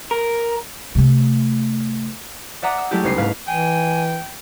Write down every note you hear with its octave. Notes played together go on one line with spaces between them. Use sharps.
A#4
C3 A3
D5 E5 F#5 A#5 D6 D#6
E6
F#3 G#3 A3 C#4 E4 G4
F#1 C2 C#4 D#4 C7
G#2 A3 B4 F5
E3 G5 G#5